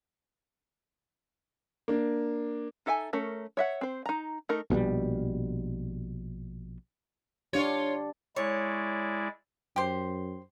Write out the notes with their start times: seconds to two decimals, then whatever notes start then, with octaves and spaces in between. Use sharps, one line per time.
1.88 A#3 D4
2.86 D#4 A4 E5 G5 G#5
3.13 A3 C#4 A#4
3.57 C#5 E5 F#5
3.81 C4 C5
4.06 D#4 A#5
4.49 A3 D#4 A#4
4.70 A#1 B2 D3 G3
7.53 D4 F4 G4 C#5
8.36 G#3 E4 C#5 D5
9.76 F#2 G4 C5